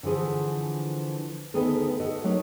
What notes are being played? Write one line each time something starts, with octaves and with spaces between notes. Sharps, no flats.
D3 E3 F3 G#4
D2 D#3 B3 G#4 A4
F#4 A4 D#5
F#3 A3 A#3 D#4